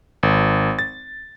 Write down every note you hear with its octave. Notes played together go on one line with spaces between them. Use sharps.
G#1
A6